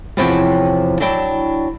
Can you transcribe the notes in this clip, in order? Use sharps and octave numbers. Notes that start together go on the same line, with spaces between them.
E2 C3 F3 E4 C#5 G5
F#3 D4 E4 G5